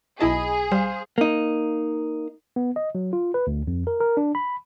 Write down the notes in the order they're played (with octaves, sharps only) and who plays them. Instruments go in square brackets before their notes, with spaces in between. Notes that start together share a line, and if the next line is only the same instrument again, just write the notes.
[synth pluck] B1 E4 A5 [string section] G#4 [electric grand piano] D#5 B5
[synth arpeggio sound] G3 [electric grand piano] C5 F5
[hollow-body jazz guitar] A#3 D#4
[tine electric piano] B3
D#5
F#3
F4
B4
D2
F2
A#4
A#4
D4
B5